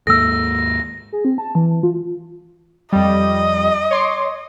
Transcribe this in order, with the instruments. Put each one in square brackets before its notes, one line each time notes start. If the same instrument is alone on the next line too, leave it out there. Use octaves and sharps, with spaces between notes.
[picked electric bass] D#2 G#2 A#3 [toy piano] A4 E6 [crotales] A#6
[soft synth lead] G#4
C4
A5
E3
F4
[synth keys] F2 G3 [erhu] D#5
[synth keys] C#5 C6 D6